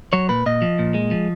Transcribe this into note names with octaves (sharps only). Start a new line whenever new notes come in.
F#3 C#5
A#2 B4
A#2 D#5
F3
A#2
G#3
F3